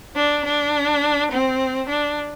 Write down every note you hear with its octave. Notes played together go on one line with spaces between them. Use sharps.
D4
D4
C4
D4